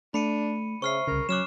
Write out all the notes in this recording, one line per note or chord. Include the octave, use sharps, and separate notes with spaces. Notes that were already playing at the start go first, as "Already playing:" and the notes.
A3 D4 B5 C#7 D#7
C#3 C5 E5 C#6 F6 C7
C2 C#3 A#4
F#3 C#4 D6 F6 F#6 E7